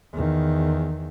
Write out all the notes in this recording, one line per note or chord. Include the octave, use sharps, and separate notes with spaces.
E2 D#3